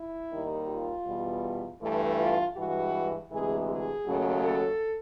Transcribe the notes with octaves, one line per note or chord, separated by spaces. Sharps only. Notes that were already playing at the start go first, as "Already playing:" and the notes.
Already playing: E4
D#2 D#3 G3
F4
E2 B2 G3
G2 E3 A3
F4
G2 E3 G#3 F#4
D2 C3 E3 G#3 G#4
G#4
D#2 C#3 F#3 A3
A4